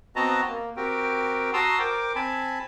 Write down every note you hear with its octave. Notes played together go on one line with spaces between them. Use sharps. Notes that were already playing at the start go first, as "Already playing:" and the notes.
B3 C4 F#4 D#5 A5 A#5
A#3
C4 F#4 G4 A#4 G5
F#4 A5 A#5 C6 D#6 E6
A#4 C5 G5 D6
C4 G#5 A5 B5